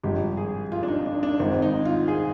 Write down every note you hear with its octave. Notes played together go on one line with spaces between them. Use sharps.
G#1 G2 F3 G4
G#4
F4
D4
D#4
D4
D4
G#1 G#2 D#3 C4
D#4
F4
G#4